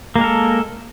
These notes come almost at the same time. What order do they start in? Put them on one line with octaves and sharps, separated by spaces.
A#3 G#3 A#4 A4